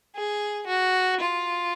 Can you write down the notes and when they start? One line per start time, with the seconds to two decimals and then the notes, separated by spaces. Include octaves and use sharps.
0.16 G#4
0.67 F#4
1.20 F4